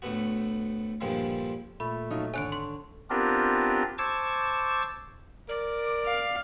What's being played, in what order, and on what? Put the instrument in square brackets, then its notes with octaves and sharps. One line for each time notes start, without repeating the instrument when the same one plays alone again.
[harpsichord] D2 A2 A3 B3 F#4
G2 A#2 D3 F3 G3 G#3
[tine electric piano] A#2 [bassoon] A3 [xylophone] B5
[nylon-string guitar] F3 F#3 D#4
[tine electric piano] G#1 A4 [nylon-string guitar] D3 C#5 [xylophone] G#5 F#6 D7
[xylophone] C6
[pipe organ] B3 C4 D4 F4 G4 A#4
C5 A5 C#6 D6 E6 G#6
[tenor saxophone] A#4 [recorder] D5
[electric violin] F5